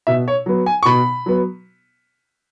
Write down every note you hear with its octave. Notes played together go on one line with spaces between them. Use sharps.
B2 E5
C#5
F#3 B3
G#5
C#6
B2 B5
F#3 B3